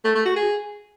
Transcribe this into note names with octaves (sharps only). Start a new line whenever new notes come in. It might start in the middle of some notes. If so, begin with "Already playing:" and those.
A3
A3
F#4
G#4